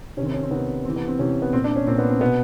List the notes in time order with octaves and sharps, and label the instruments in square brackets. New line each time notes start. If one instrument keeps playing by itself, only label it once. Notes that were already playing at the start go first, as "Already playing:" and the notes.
[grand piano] C3 C#4
D#3 C4
C#4
C4
C3 D#3 B3
C3 E3 C4
B3
C4
C3 E3 C#4
B3
A#2 C4
D4
C#4
A#2 C4
B3
C4
B2 B3